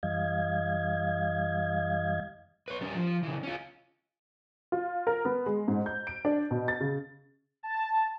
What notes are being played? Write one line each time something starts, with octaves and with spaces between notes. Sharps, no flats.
F#2 E3 G3 D#5 F5 G#6
B4 C#5
G3 C#4
F3
C#3 E3
C#4 F4
F4
A#4
B3
G#3
G#2
G6
D7
D4
B2
A6
C#3
A5